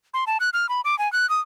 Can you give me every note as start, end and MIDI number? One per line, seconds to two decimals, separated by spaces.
0.14 0.24 84
0.27 0.38 81
0.40 0.50 90
0.53 0.69 89
0.69 0.81 83
0.84 0.97 86
0.98 1.11 80
1.12 1.28 90
1.29 1.40 87